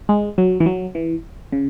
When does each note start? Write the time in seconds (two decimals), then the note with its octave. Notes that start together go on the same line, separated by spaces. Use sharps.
0.09 G#3
0.38 F#3
0.60 E3
0.66 F#3
0.95 E3
1.52 C#3